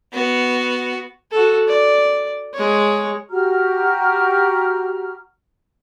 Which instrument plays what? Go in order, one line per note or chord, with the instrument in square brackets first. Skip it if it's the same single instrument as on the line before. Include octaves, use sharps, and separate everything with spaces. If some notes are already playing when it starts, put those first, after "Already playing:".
[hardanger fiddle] B3 F#4
[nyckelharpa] F#4 A4
D5
G#3 C#5
[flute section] F#4 G4 A#5 F6